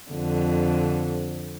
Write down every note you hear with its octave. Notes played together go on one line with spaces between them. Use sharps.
F2 D3